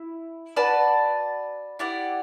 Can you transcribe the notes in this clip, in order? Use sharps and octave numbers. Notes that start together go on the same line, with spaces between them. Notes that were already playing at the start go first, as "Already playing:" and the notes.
Already playing: E4
F#4 B4 D5 A5
E4 G4 D5 F#5